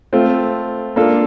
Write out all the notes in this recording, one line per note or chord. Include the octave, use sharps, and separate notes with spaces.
A3 C4 F4
A#3 D4 F4 A4